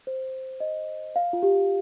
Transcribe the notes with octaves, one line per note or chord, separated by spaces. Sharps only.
C5
D#5
F5
F4
G4